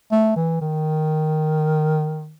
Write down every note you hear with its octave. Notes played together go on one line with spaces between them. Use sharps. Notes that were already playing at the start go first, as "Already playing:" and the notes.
A3
E3
D#3